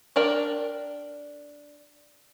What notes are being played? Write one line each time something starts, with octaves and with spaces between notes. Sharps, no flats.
D4 A#4 D5 G5